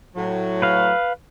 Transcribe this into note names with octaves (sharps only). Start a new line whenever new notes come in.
A2 F#3
B4 F5